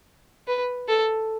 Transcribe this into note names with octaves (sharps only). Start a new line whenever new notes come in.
B4
A4